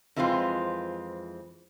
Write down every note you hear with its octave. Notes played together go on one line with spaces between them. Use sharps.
F2 E3 G#3 C4 F4